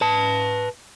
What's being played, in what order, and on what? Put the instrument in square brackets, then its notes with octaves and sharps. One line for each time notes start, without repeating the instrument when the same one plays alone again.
[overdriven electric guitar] B4 A5